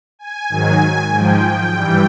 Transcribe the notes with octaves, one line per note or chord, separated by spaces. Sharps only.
G#5
G#2 D#3 F#3 G#5
G#2 F3 G5
G2 E3 G3